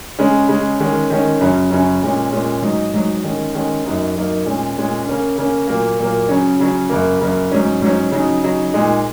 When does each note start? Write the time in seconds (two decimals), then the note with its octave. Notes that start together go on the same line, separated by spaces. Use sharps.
0.19 C#3 G#3 C#4
0.48 C#3 G#3 C#4
0.80 D#3 G#3 C#4
1.10 D#3 G#3 C#4
1.40 F#2 C#3 F#3 C#4
1.71 F#2 C#3 F#3 C#4
2.02 A#2 G#3 C#4
2.32 A#2 G#3 C#4
2.62 G#2 F#3 D#4
2.94 G#2 F#3 D#4
3.23 D#3 G#3 C#4
3.54 D#3 G#3 C#4
3.85 F#2 F#3 A#3 D#4
4.16 F#2 F#3 A#3 D#4
4.45 A#2 G#3 C#4
4.76 A#2 G#3 C#4
5.07 C#3 A#3 C#4
5.38 C#3 A#3 C#4
5.68 A#2 F#3 A#3
5.99 A#2 F#3 A#3
6.29 C#3 F#3 C#4
6.60 C#3 F#3 C#4
6.90 F#2 C#3 A#3
7.21 F#2 C#3 A#3
7.51 G#2 F#3 C#4
7.82 G#2 F#3 C#4
8.12 C#3 F#3 D#4
8.43 C#3 F#3 D#4
8.73 A#2 G#3 D#4